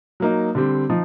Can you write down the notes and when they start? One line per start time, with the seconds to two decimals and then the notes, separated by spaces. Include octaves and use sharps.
0.20 F#3 A#3 D#4
0.55 D3 G3 C4
0.90 F3 D#4